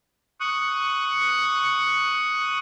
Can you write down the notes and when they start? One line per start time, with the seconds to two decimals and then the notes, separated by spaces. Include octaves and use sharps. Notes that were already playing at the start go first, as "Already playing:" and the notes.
0.40 C#6 D#6 F#6